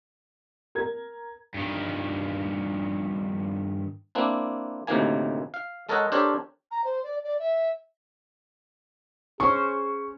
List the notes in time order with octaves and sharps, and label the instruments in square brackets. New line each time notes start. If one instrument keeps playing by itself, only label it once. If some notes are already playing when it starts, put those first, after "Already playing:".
[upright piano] A#4 G#6
[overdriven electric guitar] G2 D#3
[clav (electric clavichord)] A#3 C4 D4 E4
D2 A2 C3 D#3 A#3 G#5
F5
G#3 A4 A#4 C#5 D#5 F#5
D4 G4 A4 A#4 C5 C#5
[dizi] A#5
C5
D5
D5
E5
[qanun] C#4 C5 [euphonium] G#4 [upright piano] C#6